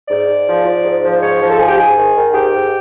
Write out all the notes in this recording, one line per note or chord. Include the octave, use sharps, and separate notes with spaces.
G#2 D5
G#2
F3
F3
G#2
F3
G#2 C#5
F3
A4
G#2 G#4
G4
G#2 G#4
D#3
D#3
G#4
G#2 G4
G#2